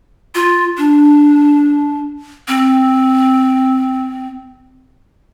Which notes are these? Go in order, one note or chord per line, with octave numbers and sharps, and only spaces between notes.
F4
D4
C4